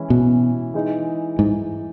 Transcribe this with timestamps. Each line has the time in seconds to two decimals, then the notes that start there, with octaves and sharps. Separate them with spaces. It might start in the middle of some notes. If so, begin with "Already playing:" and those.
Already playing: E3 G#3 C#4 E4
0.10 B2
0.74 E3 G#3 D#4
1.39 G#2